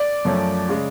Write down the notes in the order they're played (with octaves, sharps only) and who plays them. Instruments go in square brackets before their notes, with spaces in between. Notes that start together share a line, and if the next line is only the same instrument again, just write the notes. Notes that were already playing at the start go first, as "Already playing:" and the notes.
Already playing: [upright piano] D5
[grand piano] F#2 F3 A3 C#4
C#3 G#3